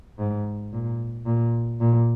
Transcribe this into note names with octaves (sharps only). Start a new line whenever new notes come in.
G#2
A#2
A#2
A#2